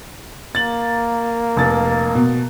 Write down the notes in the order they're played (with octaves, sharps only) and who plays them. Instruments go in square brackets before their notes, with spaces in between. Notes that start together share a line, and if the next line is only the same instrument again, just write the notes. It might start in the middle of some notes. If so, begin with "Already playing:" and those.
[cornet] A#3 [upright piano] A6 F#7
[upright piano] F1 A6
B2